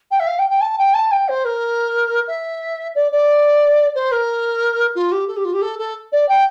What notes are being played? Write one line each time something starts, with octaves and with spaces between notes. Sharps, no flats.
G5
E5
F5
G5
G5
A5
G5
A5
G5
C5
A#4
E5
D5
D5
C5
A#4
F4
G4
A4
G4
F4
G4
A4
A4
D5
G5